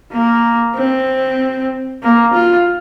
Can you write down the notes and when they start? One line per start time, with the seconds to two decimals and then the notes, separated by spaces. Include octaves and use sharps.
0.12 A#3
0.75 C4
2.03 A#3
2.34 F4